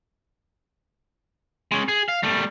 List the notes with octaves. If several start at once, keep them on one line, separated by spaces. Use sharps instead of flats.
G#3 C#4
G#4
F5
G3 A3